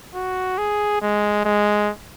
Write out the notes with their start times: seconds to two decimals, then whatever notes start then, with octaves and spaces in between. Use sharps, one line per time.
0.15 F#4
0.58 G#4
1.01 G#3
1.45 G#3